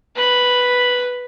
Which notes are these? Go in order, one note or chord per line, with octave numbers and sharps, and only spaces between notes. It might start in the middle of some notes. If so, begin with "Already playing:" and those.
B4 B5